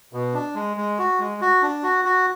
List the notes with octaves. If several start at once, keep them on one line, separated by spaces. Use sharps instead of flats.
B2
D4
G#3
G#3
F#4
G#3
F#4
D4
F#4
F#4